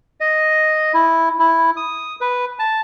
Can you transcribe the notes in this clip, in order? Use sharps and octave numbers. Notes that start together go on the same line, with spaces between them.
D#5
E4
E4
D#6
B4
A5